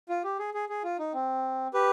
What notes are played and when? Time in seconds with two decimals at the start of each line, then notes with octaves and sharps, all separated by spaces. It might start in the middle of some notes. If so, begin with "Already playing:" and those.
0.09 F4
0.24 G4
0.39 G#4
0.54 G#4
0.69 G#4
0.84 F4
0.99 D#4
1.14 C4
1.74 G4 B4